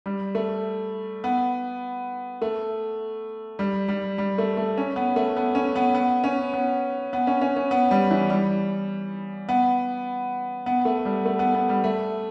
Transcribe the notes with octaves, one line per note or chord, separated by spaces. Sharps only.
G3
A3
B3
A3
G3
G3
G3
A3
A3
C#4
B3
A3
B3
C#4
B3
B3
C#4
B3
B3
C#4
C#4
C#4
B3
G3
E3
G3
B3
B3
A3
G3
A3
B3
B3
G3
A3